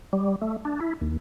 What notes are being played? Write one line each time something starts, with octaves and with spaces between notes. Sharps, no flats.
G3
A3
D4
E4
D#2